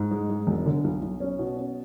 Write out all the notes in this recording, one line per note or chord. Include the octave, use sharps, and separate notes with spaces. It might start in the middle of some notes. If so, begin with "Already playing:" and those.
Already playing: G#2
G#3
G#3
E1
D3
B1
B1
C#4
B2
C#4